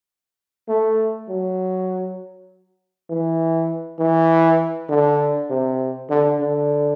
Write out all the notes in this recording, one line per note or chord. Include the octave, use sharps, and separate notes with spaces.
A3
F#3
E3
E3
D3
C3
D3
D3